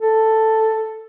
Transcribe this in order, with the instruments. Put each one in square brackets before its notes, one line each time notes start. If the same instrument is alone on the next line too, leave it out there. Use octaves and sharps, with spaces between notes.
[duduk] A4